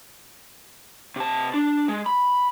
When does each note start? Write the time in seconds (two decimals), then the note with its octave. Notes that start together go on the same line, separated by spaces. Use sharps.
1.16 C3 A5
1.54 D4
1.88 G#3
2.06 B5